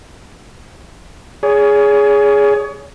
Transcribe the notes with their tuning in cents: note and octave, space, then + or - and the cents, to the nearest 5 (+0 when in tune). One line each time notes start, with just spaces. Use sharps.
G#4 +0 C#5 +35